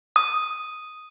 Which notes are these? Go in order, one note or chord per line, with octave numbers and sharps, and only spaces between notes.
D#6